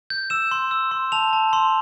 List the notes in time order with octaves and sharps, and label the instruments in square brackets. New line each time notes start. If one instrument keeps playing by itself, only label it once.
[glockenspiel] G6
E6 E7
C6
E6
C6
A5 F7
A5
C6